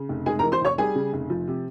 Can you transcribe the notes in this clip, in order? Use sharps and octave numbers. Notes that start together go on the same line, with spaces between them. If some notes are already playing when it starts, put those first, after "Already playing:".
Already playing: C#3
F1
G#3 G#4 G#5
A#4 A#5
E3
C5 C6
F1 C#5 C#6
G3 G#4 G#5
C#3
F1
F3
C3